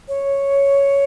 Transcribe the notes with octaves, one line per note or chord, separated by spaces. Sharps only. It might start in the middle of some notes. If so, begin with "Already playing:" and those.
C#5